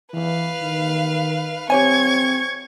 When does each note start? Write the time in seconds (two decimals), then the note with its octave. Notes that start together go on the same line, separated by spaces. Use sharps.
0.13 E3 B4 F5
0.62 D#3
1.70 C4 G4 C#5 G#5 C#6 G#6